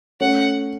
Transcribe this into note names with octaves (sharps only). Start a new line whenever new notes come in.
A3 C#4 F#5